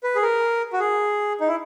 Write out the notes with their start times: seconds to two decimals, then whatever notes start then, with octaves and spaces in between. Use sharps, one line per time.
0.04 B4
0.15 G#4
0.22 A#4
0.73 F#4
0.80 G#4
1.40 D#4
1.48 E4